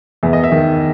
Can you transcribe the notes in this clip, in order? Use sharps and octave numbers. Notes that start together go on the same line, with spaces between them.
E2 E5
D#5
E5
D#3